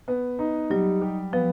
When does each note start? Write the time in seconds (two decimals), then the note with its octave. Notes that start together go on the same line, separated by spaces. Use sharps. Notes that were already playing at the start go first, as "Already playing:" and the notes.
0.08 B3
0.39 D#4
0.70 F#3 G3
1.01 G4
1.33 F3 B3